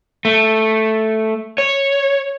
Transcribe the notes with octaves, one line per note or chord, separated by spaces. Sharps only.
A3
C#5